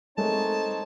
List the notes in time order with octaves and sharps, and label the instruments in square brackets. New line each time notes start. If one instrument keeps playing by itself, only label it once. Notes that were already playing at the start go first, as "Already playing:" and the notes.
[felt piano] G#3 A3 A#4 [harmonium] C4 D#4 C#5 [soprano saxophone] A5